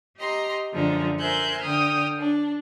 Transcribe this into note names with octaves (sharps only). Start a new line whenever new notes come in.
G4 D#5 A#5 C6
F#2 D3 F3 G#3 A#5
A#4 C5 E5 G#5 F#6 G6
D3 G5 D#6 F6
D4